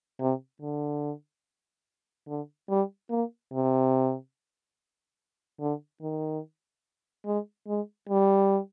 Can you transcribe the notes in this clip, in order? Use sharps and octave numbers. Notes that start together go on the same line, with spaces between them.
C3
D3
D3
G3
A#3
C3
D3
D#3
G#3
G#3
G3